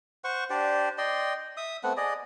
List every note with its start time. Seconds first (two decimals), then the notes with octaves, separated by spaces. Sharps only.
0.24 C5 F#5 C#6
0.50 D4 G4 C5 D5
0.98 D5 D#5 G5 C6
1.57 E5 D#6
1.84 A3 B3 C4 F#5
1.97 G#4 D5 D#5